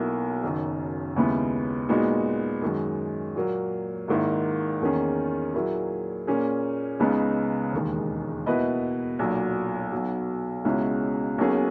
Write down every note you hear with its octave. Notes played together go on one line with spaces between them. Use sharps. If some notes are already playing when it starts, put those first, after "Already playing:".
Already playing: B1 B2 A#3 E4
F#1 F#2 D#3
D#2 C#3 G#3 B3 E4
A#2 G#3 B3 D#4 F#4
F#2 D#3 G#3
A#2 F#3 A#3
G#1 G#2 D#3 A#3 E4
E2 D#3 A#3 C#4 G#4
A#2 F#3 A#3 E4 G#4
A#2 A#3 C#4 G#4
C#2 C#3 G#3 B3 D#4
E1 D#2 D#3 G#3
B2 A#3 E4 B4 D#5
B1 A#2 F#3
B1 B2 F#3
C#2 B2 G#3 C#4 E4
B1 B2 A#3 C#4 G#4